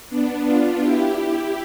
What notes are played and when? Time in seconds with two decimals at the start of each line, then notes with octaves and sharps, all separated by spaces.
0.09 B3 D4
0.44 D4 F4
0.80 E4 G4
1.14 E4 G4